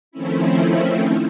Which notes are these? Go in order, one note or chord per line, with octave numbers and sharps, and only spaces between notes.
D#3 F3 A3 C4 C#4 E4